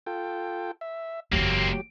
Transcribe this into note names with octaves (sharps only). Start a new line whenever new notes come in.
F4 A4 G5
E5
F#1 E2 F#3 A#3 C4 G4